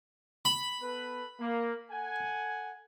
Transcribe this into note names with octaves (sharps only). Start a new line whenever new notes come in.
B5
B3 A4 B4
A#3
A4 F#5 G#5